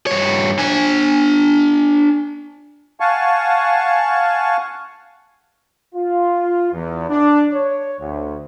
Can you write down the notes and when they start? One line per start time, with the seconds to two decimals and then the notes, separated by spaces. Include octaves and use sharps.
0.07 G2 C#5
0.59 D4 G#5
3.00 F5 F#5 G#5 A5 C#6
5.95 F4
6.73 E2
7.09 D4
7.53 C#5
8.00 D2